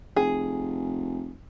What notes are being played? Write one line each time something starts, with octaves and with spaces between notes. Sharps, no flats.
F1 G#4